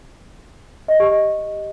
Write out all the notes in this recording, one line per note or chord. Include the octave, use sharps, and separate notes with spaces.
D#5
G4
D#5